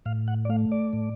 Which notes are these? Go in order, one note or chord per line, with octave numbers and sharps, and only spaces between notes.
A2 F5
F#5
D5
A3 F5
D5
A2